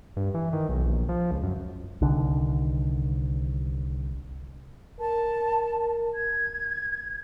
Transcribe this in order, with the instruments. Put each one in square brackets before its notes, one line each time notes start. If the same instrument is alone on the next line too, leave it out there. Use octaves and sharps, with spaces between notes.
[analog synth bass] G2
E3
D#3
B1
A#1
F3
C#2
F#2
[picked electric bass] C2 D3 D#3
[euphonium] A#4 [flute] A5
[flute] G#6